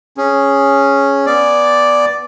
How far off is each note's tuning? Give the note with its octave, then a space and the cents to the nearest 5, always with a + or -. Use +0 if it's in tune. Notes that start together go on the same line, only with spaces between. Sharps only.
C#4 +0 G#4 +0
B3 +0 D5 +0 G#5 +0